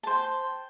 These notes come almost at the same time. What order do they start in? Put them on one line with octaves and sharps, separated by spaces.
A5 C5 G5